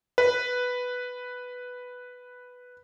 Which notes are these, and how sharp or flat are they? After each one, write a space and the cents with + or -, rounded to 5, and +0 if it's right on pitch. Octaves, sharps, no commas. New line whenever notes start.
B4 +0